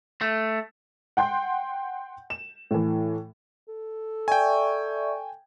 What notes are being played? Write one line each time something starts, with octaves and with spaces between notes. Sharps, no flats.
A3
F#5 G5 C6 G6
E7
A2 E3
A4
D5 E5 G5 G#5 C#6